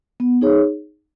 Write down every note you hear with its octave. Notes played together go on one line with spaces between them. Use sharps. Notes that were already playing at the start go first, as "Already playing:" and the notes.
B3
D#4 G#4 C#5